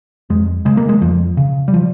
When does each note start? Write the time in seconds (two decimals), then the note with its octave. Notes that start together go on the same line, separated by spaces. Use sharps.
0.30 F2 G#3
0.65 C#3 G#3
0.77 A#3
0.89 G#3
1.01 F2 F3
1.37 C#3
1.68 G3
1.74 F3